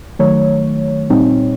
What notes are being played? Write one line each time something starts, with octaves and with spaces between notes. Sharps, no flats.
D#3 F#3 A3 C#5
A#2 G3 C4 D#4